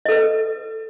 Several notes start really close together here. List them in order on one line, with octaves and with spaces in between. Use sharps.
D#5 A4 B4